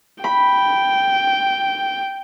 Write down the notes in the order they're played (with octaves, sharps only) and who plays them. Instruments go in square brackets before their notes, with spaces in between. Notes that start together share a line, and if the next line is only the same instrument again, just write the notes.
[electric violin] G5 [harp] B5